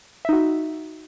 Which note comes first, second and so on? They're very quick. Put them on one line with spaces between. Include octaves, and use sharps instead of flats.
E5 D#4 F#4